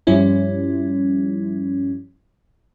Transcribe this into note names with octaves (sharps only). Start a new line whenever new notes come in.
G2 F3 G3 C#4 E4